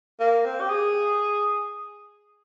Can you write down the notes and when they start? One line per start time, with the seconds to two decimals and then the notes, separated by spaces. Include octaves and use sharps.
0.20 A#3
0.45 C4
0.60 G4
0.70 G#4